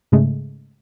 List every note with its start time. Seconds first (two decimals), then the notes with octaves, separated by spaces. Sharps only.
0.12 G#2 C#3 G#3 A3